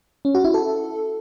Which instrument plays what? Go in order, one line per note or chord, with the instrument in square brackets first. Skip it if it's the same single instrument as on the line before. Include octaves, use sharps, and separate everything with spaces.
[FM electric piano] C#4
F#4
E4
A4